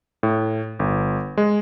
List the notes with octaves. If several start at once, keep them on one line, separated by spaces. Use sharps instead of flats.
A2
G1
G#3